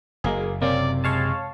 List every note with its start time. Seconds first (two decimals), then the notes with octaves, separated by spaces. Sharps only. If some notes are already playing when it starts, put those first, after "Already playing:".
0.24 F#1 G#3 A#3 G#4
0.62 C3 A#3 C#4 D5
1.04 G#3 C#5 F5 A5